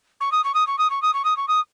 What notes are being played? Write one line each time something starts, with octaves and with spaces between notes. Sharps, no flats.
C#6
D#6
C#6
D#6
C#6
D#6
C#6
D#6
C#6
D#6
C#6
D#6